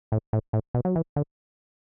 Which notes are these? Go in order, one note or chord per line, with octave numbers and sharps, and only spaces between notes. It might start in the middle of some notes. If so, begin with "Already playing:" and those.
A2
A2
A2
B2
F#3
E3
D3